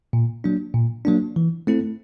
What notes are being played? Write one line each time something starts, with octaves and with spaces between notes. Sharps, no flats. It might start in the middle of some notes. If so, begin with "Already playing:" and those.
A#2
F#3 A#3 D4
A#2
F#3 A#3 D4
E3
A3 C4 E4 A4